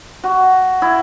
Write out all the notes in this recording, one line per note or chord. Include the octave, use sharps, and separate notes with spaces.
F#4
E4